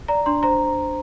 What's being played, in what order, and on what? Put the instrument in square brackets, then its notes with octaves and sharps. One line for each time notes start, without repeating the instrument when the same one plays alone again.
[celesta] D5 A#5
D4 C6
C5 A#5